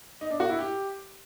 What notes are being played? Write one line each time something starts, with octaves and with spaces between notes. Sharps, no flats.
D#4
D4
F#4
E4
G4